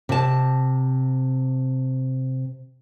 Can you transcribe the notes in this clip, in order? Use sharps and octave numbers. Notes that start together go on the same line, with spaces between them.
C3 A5